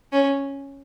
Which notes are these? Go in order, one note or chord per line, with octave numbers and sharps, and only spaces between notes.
C#4